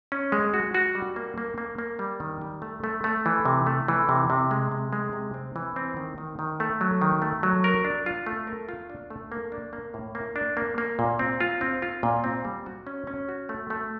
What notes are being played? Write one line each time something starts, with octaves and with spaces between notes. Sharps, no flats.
C#4
G#3
F#4
F#4
G3
A#3
A#3
A#3
A#3
G3
D#3
G3
A3
A3
A3
E3
C3
A3
E3
C3
C3
G#3
C3
G#3
C3
C4
E3
C4
D#3
D#3
D#3
A3
F#3
D#3
A3
F#3
A#4
D4
F4
A3
A#4
F4
D4
A3
A#3
D4
A#3
A2
A#3
D4
A#3
A#3
A#2
C4
F4
C4
F4
A#2
C4
G3
F#4
C#4
C#4
F#4
A3
A3